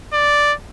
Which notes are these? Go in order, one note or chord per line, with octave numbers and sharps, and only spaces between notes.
D5